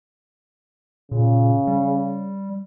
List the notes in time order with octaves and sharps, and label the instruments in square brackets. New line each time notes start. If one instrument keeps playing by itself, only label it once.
[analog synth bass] A#2 [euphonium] C#3
[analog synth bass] G3